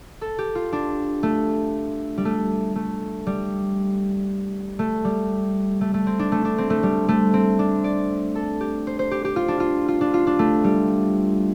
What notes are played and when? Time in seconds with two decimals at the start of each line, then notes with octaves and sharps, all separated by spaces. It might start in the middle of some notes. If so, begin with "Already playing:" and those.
0.21 A4
0.38 G4
0.55 F4
0.73 D4
1.23 A3
2.18 G3
2.25 A3
2.76 A3
3.27 G3
4.79 A3
5.04 G3
5.81 A3
5.94 A3
6.06 C4
6.19 D4
6.32 A3
6.45 D4
6.58 C4
6.70 A3
6.83 G3
7.09 A3
7.34 C4
7.59 D4
7.84 D5
8.35 A4
8.60 G4
8.87 C5
8.99 C5
9.11 G4
9.25 G4
9.36 F4
9.48 D4
9.60 F4
9.88 F4
10.01 D4
10.14 F4
10.27 D4
10.39 A3
10.64 G3